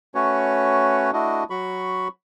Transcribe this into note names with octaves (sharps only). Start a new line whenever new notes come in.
A3 C#4 F#4 B4 C#5
A3 D4 E4 F#4 D#5
F#3 F#4 B5 C#6